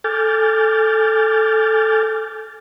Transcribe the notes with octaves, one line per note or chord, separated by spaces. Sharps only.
A4 G#5 D6 F6 G6 A6